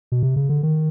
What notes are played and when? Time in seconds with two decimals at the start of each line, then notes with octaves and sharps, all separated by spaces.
0.12 B2
0.23 C3
0.36 C#3
0.49 D3
0.63 D#3